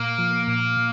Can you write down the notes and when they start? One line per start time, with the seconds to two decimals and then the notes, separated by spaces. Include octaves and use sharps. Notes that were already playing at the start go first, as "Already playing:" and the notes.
Already playing: A#2 A#3
0.19 F3
0.48 A#2
0.77 A#2